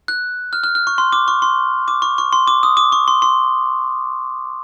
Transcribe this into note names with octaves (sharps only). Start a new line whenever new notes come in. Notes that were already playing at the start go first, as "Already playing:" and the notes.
F#6
F6
F6
F6
C#6
C6
D6
C#6
C6
D6
C#6
C#6
C6
D6
D#6
D6
C#6
C6
C6